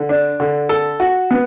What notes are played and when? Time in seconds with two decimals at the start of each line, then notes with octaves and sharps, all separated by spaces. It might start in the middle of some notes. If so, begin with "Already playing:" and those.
Already playing: D3
0.09 D4
0.40 D3
0.69 A4
1.00 F#4
1.31 B3